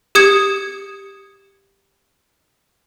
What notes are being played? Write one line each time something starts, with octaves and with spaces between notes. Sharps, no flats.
G4 D#6 G#6 C#7